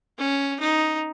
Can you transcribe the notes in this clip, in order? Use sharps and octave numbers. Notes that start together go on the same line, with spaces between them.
C#4
D#4